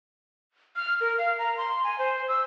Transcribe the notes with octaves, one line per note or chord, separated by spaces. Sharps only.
F6
A#4
F5
A#5
C6
G#5
C5
E6